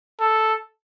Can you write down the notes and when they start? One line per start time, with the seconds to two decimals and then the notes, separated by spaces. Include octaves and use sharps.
0.20 A4